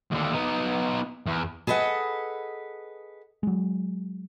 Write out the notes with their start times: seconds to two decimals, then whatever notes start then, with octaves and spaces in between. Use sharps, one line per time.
0.12 D#2 D3
0.33 B3 D#4
1.27 E2
1.67 G#4 A4 B4 D#5 F#5
3.43 F#3 G#3